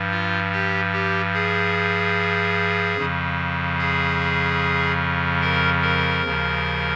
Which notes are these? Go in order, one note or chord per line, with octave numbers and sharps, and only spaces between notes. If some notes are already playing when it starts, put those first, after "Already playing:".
Already playing: G2 F3
F4
G4
G4
G#4
F2 C#3 F3
G#4
A#4
A#4
D#2 C#3 F3